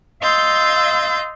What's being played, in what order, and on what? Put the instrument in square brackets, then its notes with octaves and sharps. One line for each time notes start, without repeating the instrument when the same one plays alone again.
[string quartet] D#5 F5 C6 E6 G6 A6